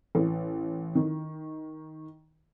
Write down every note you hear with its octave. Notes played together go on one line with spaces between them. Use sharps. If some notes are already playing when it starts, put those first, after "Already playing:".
A1
D#3